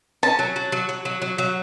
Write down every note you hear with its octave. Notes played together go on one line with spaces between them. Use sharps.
C#4 A5
F#3
F#3
F#3
F#3
F#3
F#3
F#3